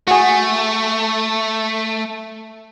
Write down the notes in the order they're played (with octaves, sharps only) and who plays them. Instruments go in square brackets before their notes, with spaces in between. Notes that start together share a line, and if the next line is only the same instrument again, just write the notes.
[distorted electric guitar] A3 [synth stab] F#4 G#4